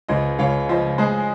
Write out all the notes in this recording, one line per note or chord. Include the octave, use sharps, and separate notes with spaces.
C#2 C5 D#5
C#2 C#5 F5
F3 C5 D#5
G#3 G#4 C5